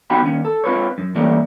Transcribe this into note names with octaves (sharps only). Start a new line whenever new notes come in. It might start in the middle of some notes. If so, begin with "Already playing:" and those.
B3 D#4 F#4 G4 G5 B5
D#2 C#4
A4
C4 F4 B4 C#5
F#2
E3 G3 A3 A#3 C#4